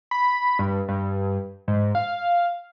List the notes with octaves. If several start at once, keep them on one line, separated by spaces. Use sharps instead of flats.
B5
G2
G2
G#2
F5